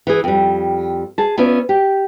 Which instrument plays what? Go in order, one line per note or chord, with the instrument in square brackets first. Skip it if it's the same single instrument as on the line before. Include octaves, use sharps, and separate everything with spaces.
[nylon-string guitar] E3 G#4
F2 G3
G#4 A5
B3 C#4 F4 D5 E5
G4